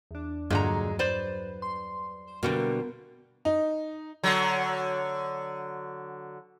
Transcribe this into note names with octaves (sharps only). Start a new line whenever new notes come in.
E2 D4
G2 A#2 D3 G#3 A#5
F#3
B4 C5 D5
C6
B2 D3 G3 A#3 A#4
D#4
D3 F#3